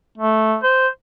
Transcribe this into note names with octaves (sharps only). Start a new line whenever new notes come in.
A3
C5